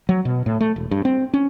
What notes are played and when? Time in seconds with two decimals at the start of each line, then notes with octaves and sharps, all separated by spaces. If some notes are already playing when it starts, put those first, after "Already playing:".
0.09 F#3
0.25 B2
0.46 A2
0.61 A3
0.76 E1
0.91 G2
1.05 C4
1.34 C#4